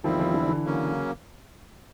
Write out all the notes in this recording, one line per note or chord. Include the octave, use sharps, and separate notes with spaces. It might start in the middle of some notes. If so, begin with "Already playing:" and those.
E2 B2 D#3 F3 G3 C4 E4
D#3 F3
D3 E3
D3 E3
C#3 F#3 A#3 C#4